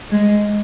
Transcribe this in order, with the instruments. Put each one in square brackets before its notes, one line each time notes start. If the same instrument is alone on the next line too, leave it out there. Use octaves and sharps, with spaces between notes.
[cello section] G#3